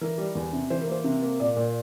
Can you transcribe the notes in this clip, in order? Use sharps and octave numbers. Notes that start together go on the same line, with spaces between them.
E3 A#4
G3
E2
C3
E3 C5
A#4
A#3 C5
C3
A#3
A#2 D5
A#2